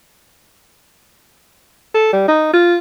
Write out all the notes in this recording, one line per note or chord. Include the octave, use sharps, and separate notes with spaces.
A4
G3
D#4
F4